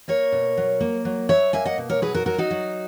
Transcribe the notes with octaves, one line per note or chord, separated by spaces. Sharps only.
A#3 A#4 C#5
B2
F#3
A#3
F#3
F#3 C#5 E5
A#3 E5 G#5
D#5 F#5
B2
A#4 C#5
F#3 G#4 B4
F#4 A#4
F#3 F#4 A#4
D#4 F#4
F#3